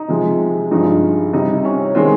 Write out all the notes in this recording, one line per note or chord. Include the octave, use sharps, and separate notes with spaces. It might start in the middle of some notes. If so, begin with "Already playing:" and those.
Already playing: D#4
C3 F3 G#3
G2 F3 G#3 D#4
C3 G3 D#4
C#4
D#3 G#3 C4